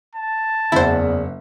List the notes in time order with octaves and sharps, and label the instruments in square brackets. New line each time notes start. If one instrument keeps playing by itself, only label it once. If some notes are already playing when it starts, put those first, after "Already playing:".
[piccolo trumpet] A5
[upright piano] F#1 E5 F#5 [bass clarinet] E2 [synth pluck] E4 C5